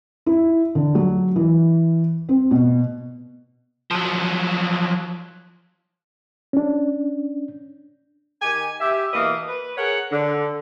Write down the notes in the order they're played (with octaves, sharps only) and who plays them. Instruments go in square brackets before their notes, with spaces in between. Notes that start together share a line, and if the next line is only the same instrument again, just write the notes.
[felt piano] E4
D3
F#3
E3
C4
B2
[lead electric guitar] F3 F#3
[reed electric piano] C#4 D4
[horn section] D#3 G4 G#5
G4 E5
B2 E3 A#3 B4 D#5
B4
G#4 A#4 C#5 F#5
D3